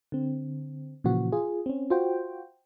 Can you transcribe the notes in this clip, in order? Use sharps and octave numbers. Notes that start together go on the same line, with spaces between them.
D3 C4
A#2 C#3 E3 F3 F#4
F4 G#4
C4 C#4
F4 F#4 C5 G5